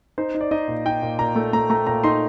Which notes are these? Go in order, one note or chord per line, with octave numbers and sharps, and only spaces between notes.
D#4 C5
D#4
D5
D#4 D#5
A#2
D#4 G5
A#2
A#2 A#5
A3
A3 A#5
A3 A#5
A#2 A#5
D#4 C6